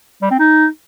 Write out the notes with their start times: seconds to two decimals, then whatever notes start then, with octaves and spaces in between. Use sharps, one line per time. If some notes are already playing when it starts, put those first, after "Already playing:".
0.22 G3
0.31 C4
0.39 D#4